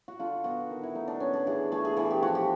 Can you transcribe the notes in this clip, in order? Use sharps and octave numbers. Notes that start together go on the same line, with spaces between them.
F#4
D3 F4
B3 F#4
D#3
E4
A3 D#4
D4
B3 C#4
D4
E3 G#4
A3 G#4
G#4
E3 G#4
G4
F3 F#4
G4